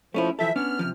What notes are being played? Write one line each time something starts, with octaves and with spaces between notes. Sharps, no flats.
F3 A3 C#4 E4
E3 F3 A4 E5
B3 C#4 D4 F6
C3 D#3 F3